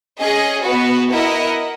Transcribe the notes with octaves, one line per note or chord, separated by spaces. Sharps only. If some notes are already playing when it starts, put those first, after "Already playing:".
C#4 G#4 D#5
B3 F#4 B4
E4 A#4 D#5 F#5